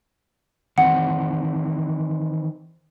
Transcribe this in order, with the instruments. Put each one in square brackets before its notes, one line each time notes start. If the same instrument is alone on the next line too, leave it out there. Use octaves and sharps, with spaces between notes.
[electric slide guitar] D#3 E3 C4 [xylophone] F#5